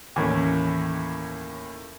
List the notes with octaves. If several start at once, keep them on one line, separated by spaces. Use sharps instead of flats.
D#2 A2 E3 C#4 D6